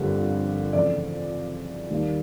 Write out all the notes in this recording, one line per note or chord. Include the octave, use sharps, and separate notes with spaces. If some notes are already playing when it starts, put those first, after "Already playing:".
Already playing: G1 F2 D3 G3 A#3
F2 C#3 E3 A3 D5
D#2 D#3 G3 A#3